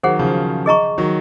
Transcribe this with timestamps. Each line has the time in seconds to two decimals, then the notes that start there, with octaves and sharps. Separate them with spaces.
0.03 D#3 F#3 G#4 C5 F#5
0.19 C#3 F3
0.66 G#4 D#5 A#5 C#6
0.98 D#3 F#3